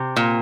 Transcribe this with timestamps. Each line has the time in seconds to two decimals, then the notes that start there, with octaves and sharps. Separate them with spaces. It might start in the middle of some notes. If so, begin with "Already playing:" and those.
Already playing: C3
0.16 A#2